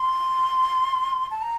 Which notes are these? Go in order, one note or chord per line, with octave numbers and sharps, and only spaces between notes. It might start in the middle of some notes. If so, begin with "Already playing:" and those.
Already playing: C6
A5
A#5